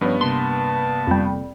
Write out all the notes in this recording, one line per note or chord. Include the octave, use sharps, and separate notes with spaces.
G2 F3 B3 C#4 C#5
C3 A#3 A5 C6
F2 G3